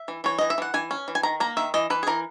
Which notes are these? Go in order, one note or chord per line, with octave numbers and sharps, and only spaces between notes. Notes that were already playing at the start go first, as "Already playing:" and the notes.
Already playing: E5
E3
E3 C#5
E3 D#5
E5
E3 F#5
E3 G#5
C#4
E3
G#5
D#3 A#5
A#3 A#5
D#3 E5
E3 D#5
E3 B4
G#4
E3 A#4